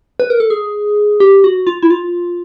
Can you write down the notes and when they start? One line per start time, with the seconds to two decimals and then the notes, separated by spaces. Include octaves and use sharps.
0.20 B4
0.30 A#4
0.40 A4
0.50 G#4
1.20 G4
1.44 F#4
1.67 F4
1.83 E4
1.90 F4